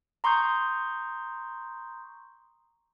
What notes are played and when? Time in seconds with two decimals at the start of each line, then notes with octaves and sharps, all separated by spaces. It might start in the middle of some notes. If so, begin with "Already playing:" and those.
0.24 A#5 C6 C#6 D#6 G6